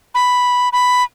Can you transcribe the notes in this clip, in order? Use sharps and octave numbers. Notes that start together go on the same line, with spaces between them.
B5
B5